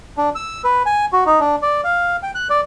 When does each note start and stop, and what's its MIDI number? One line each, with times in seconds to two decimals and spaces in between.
0.17 0.30 62
0.35 0.62 88
0.64 0.83 71
0.86 1.06 80
1.13 1.24 66
1.26 1.40 63
1.40 1.56 62
1.62 1.81 74
1.84 2.16 77
2.23 2.31 79
2.35 2.48 90
2.50 2.61 74